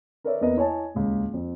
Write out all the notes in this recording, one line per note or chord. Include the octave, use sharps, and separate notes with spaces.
A#4 B4 C#5 D5 E5
E2 A#3 B3 B4 D#5
E4 C#5 D#5 G#5 A5
D#1 C#2
F2